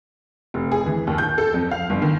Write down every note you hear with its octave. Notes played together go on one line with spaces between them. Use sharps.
F1
G#4
E3
D#2
G6
A4
F2
F5
G1
D#3